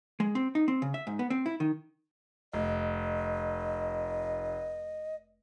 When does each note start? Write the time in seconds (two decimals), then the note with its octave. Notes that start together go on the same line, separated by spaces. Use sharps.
0.20 G#3
0.35 C4
0.55 D#4
0.68 C4
0.82 C#3
0.94 E5
1.07 G#2
1.19 B3
1.30 C4
1.46 E4
1.60 D#3
2.53 F1 D#5